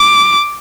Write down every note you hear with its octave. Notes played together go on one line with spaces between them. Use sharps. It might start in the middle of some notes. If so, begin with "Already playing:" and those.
Already playing: D6